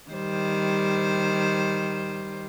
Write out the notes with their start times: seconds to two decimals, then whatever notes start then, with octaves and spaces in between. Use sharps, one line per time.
0.10 D#3 G3 C5